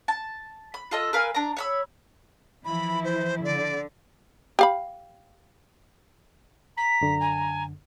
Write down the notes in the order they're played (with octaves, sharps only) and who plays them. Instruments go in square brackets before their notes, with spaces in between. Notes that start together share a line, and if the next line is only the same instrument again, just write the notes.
[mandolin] A5
B5
F4 A4 D#5
A#4 B4 F5 G#5
D4 A#5
C#5 B5 E6
[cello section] E3 F3 E4 [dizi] B5
[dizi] C5
[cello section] D3 [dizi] D5
[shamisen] G4 F5 B5
[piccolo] A#5 [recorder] B6
[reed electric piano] F#2 D3
[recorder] G#5